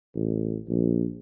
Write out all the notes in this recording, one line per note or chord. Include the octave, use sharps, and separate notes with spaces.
A1
A#1